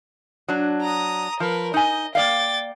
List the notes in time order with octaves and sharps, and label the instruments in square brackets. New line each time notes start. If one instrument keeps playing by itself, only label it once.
[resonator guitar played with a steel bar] F#3 D4
[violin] A#5 D#6
[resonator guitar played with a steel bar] F3 [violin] A#4 B4
[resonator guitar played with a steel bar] D#4 G#5 [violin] D#5
[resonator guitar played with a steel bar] A#3 D5 F5 [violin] G5 A6